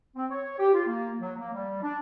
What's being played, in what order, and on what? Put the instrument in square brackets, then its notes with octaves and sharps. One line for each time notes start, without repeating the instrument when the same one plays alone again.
[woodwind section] C4
C#5
G4
F4
A#3
F#3
A#3
G3
D4